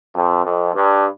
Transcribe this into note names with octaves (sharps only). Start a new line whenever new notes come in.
F2
F2
G2